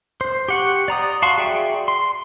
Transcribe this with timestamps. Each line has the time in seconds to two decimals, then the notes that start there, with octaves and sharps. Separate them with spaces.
0.21 C5
0.48 G4 F#5 C#6
0.88 D5 A#5 D#6
1.22 F#4 F5 A5 C6 C#6
1.38 F#4 G#4 D5 E5 G5
1.88 C6